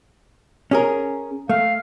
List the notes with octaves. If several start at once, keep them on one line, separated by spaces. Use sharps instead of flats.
C#4 G#4 A#4
A3 F5